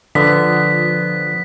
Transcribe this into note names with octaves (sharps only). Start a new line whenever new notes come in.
D3 F3 B3 B6